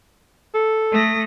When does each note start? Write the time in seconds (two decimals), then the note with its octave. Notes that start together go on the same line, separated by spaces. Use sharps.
0.54 A4
0.92 A3 D#6 A#6